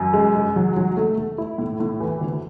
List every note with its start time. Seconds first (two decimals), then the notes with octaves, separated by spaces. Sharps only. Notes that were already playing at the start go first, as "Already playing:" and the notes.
Already playing: F#2
0.14 G#3
0.35 G#3
0.56 F#3
0.76 F#3
0.97 A3
1.18 A3
1.38 E4
1.58 A2
1.80 A2
2.00 E3
2.21 D2